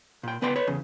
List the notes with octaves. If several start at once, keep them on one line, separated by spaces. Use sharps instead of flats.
A#2 G5
C#2 B3 B4 D5 G5 C6
B4 C#5
E2 C#3